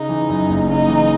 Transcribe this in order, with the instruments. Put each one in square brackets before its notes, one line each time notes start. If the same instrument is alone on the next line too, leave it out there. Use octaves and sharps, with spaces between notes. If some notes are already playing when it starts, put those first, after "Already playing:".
Already playing: [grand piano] C#3 [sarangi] D#4
[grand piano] E3
F#2
F#1
[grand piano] C#3 [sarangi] D#4
[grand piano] E3